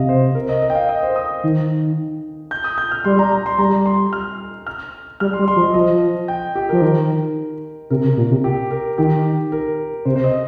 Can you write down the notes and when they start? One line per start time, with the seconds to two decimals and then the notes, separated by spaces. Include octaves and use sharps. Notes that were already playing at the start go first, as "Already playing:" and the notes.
Already playing: C3 D#5 F5
0.09 C5
0.35 A#4
0.49 D#5
0.62 D#5
0.70 G5
0.75 F5
0.89 D#5
1.03 C5
1.16 D#6
1.44 D#3
2.51 G6
2.64 D#6
2.78 G6
2.92 F6
3.05 G3 C6
3.19 A#5
3.32 A#5
3.46 C6
3.58 G3 A#5
3.86 C6
4.13 F6
4.67 F6
5.20 G3 F6
5.33 C6
5.39 G3
5.48 C6
5.56 F3
5.61 D#5
5.74 F3 D#5
6.28 G5
6.55 G4
6.69 F3 A#4
6.82 D#3
7.90 C3 A#4
8.04 C3
8.17 A#2
8.31 C3
8.44 G4
8.71 A#4
8.98 D#3 G4
9.52 A#4
10.05 C3 C5
10.16 C5
10.24 D#5